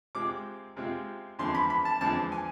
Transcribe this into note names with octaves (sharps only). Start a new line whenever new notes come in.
C3 G#3 C4 F4 D6
C3 G#3 C4 F4
E2 D3 F3 G#3 C4 C6
B5
B5
A5
E2 D3 F3 G#3 C4 A5
G#5